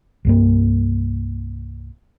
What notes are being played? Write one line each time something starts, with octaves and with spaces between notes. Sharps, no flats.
C2 G2 A#3